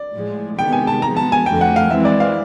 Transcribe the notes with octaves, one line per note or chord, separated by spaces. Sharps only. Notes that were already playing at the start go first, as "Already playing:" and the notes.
Already playing: D5
A2 F3 G#3
C3 D#3 G#3 B3 G5
G#5
A5
F3 G#3 B3 A#5
A5
G#5
F2 D3 F3 A3 G5
F#5
F5
E3 G#3 C4 E5
D5
F5